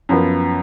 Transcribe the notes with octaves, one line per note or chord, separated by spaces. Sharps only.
F#2 F3 B3